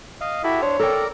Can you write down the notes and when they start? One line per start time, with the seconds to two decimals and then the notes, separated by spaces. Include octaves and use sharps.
0.21 D#5 F5
0.44 E4 F#4 G4 A4
0.62 D4 C5 C#5
0.80 A4 A#4 D5 G5 A#5